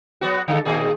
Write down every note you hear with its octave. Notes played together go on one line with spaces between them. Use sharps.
F#3 B3 F#4
D3 G#3 A4
A#2 D#3 G#4